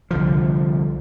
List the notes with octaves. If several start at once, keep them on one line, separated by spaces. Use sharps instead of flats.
C2 D3 F3